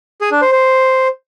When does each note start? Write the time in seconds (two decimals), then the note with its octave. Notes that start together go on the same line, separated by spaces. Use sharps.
0.21 G#4
0.31 D4
0.42 C5
0.52 C5